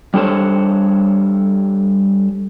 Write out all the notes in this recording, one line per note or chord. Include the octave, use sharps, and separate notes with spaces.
G3 D4 A4 C5 C#5